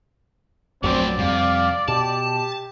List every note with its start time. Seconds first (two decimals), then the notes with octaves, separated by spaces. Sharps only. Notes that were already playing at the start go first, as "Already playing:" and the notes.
0.84 A#1 F#2 F#3 A3 C4 B4 D5
1.19 F2 C3 G3 F5
1.88 B2 G4 A5